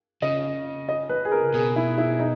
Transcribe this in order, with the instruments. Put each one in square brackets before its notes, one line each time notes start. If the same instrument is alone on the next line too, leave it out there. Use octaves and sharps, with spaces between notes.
[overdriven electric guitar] C#3 [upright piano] D#5
[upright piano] D#5
B4
G#4
A#4
[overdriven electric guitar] B2 [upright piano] G#4
[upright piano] E4
E4
D#4